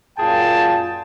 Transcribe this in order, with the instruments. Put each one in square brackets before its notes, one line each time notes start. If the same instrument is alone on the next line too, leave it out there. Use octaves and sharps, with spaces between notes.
[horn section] F#2 A#2 F4 G#4 G5 A5